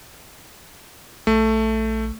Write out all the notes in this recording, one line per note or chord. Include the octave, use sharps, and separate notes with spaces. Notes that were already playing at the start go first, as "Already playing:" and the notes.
A#1 A3